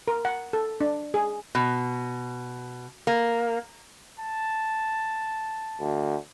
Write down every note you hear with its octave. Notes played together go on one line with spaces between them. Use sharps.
A#4
F#5
A4
D4
G#4
B2
A#3
A5
D2